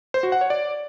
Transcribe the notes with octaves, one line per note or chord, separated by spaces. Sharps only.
C5
F#4
F#5
C#5
D5